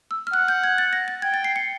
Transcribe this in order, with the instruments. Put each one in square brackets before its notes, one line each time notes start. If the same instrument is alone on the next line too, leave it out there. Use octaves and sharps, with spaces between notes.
[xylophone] E6
F6
[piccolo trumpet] F#5 [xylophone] F#6
[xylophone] G6
G#6
A6
A#6
A6
[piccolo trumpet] G5 [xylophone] G#6
[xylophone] A6
C7
C#7